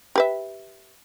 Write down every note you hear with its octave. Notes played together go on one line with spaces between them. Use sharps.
G4 B4 E5